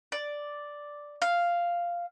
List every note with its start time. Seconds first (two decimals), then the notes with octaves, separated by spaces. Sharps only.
0.12 D5
1.22 F5